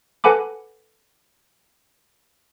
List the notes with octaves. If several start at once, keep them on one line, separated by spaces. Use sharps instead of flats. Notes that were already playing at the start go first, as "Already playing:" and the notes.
A4 B4 F#5 G#5 B5 D6